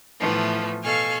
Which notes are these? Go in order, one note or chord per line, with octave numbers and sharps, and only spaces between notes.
A2 E3 F3 A3 B3
B2 A4 F5 G#5 C#6 F6